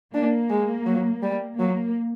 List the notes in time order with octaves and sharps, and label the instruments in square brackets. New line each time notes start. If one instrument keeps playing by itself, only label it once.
[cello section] A#3 [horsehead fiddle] D4
[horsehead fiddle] G#3
F#3
G3
[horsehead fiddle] F#3 [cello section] A#3